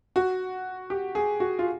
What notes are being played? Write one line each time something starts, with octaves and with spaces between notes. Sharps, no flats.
F#4
G4
G#4
F#4
F4